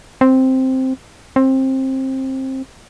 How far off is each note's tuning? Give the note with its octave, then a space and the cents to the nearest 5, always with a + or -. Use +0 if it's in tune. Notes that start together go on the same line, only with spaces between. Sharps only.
C4 +0
C4 +20